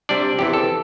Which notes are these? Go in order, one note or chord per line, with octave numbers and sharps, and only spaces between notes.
C3 G3 D4 D5
E2 C3 E3 G4
A4